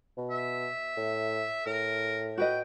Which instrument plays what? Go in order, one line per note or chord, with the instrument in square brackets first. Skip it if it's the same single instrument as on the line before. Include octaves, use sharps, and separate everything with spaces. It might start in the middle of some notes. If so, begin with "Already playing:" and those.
[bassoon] B2
[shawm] E5
[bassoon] A2
[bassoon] A2 [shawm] A#4
[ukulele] F#4 B4 D#5 [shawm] G5